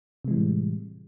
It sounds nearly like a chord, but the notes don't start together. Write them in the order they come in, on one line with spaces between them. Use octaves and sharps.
C3 G#3 E3 G3 A2